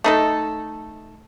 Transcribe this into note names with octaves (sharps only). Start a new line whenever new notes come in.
A3 D#4 A4